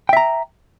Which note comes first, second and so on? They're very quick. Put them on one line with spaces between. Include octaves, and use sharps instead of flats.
G5 E5 A#5